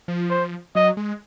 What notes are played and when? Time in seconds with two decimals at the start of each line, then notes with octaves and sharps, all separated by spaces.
0.08 F3
0.30 C5
0.75 F#3 D#5
0.97 G#3